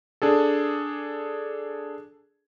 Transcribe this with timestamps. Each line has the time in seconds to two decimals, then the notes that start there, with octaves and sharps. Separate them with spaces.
0.22 D4 G#4 A4